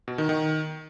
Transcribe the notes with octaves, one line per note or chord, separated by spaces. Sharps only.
B2
D#3
D#3